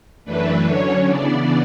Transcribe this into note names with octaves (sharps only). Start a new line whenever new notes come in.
F#2 E3 A3 D4 B4
D3 F#3 C#4 C#5
C#3 E3 B3 D4 D5